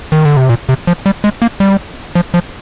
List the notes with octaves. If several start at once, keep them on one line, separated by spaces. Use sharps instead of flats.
D#3
D3
C3
A#2
C3
F3
G3
G#3
A#3
G3
F3
F3